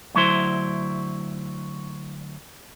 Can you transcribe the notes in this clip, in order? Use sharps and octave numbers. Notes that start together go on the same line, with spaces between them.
D2 F#3 E4 C5